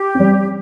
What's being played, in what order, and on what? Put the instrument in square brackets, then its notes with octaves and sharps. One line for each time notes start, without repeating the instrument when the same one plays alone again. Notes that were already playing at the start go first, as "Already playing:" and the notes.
Already playing: [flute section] G4
[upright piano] G3 C4